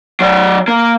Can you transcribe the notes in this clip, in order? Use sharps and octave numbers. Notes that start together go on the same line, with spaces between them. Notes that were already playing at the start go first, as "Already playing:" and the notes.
F#3 D5
A#3